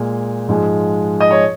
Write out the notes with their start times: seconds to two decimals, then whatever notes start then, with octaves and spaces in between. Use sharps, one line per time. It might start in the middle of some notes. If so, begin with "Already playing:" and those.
Already playing: A#2 G#3
0.48 G#2 F3 G#3
1.20 D#5
1.31 C#5